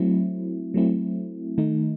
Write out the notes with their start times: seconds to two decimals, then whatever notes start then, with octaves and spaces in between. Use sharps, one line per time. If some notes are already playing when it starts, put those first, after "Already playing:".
Already playing: F#3 A3 C4 E4
0.74 F#3 A3 C4 E4
1.58 D#3 A3 D#4